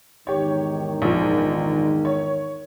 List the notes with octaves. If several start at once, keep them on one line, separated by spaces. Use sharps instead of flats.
E2 G#2 D#3 G4 C#5
A#1 F3
C#5